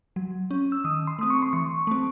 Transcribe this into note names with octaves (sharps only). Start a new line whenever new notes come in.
F#3
C#4
E6
D#3 D#6
C6
A3 C4 D#6
C#6
C6
E3 C#6
A3 C4